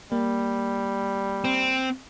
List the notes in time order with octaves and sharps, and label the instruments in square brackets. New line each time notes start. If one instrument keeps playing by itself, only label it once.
[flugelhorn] G3 [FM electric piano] A#3
[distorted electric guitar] C4